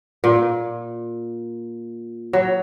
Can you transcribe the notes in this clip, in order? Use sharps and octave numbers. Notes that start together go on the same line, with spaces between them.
A#2
F#3